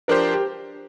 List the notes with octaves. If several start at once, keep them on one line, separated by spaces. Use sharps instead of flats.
F3 D4 G4 A#4 C5
G4